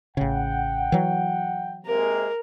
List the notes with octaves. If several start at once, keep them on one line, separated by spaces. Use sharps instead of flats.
A1 C#3 F#5 G5
E3 F#3
C3 G#3 A#3 A#4